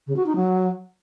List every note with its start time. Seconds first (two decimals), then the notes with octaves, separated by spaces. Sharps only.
0.07 C#3
0.17 F#4
0.26 D#4
0.36 F#3